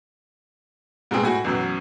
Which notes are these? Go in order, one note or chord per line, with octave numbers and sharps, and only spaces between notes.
G#2 B2 G#3 C4 G#4
A2 F#4 G#5
A1 F#2 B2 F#3